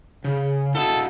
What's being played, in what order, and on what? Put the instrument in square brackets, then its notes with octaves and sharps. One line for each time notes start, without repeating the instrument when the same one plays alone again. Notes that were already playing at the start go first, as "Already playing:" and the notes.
[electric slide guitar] C#3
[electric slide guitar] E4 F#4 D#5 [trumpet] A4